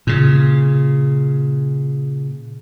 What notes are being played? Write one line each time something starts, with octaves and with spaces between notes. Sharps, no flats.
A#2 C#3